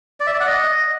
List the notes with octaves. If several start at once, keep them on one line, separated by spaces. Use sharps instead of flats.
D5
E5
D5
F#5
D#5